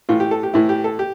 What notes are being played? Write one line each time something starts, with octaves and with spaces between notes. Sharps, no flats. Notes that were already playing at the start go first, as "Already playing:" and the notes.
A2 E3 F4
G4
A4
G4
A2 E3 E4
G4
A4
G4